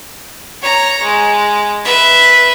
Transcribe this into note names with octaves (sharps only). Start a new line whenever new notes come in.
C#5 A#5
G#3
B4 E5